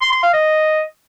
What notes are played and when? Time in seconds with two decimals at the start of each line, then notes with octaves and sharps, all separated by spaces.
0.02 C6
0.12 C6
0.23 F5
0.34 D#5